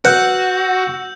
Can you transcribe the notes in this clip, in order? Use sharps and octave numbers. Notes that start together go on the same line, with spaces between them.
F#4 B4 F#5 E6 G6